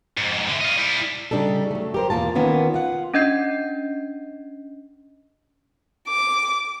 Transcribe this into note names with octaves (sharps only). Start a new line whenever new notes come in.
F2 G#2
D3 E5
F4 D#5
G3 E4
C#3 G3 D4 D#4 A4
F#3 A3
G4 A#4 C5
E2 B2 A#3 F4 A5
D#3 A#3 B3 C#4 F4
F4 F#5
C#4 D4 D#5 G6 G#6 C7
D6